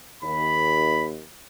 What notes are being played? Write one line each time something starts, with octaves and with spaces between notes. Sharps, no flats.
D#2 B5